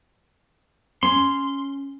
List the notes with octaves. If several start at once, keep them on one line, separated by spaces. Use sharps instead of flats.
C#4 C6